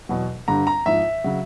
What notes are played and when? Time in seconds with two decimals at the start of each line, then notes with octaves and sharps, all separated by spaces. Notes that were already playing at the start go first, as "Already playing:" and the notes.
0.09 E2 B2 F#3
0.48 G2 D3 G3 A#5
0.67 A#5
0.86 G#2 F3 E5
1.24 C#3 F#3